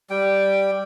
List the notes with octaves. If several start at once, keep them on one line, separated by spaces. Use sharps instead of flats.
G3 G5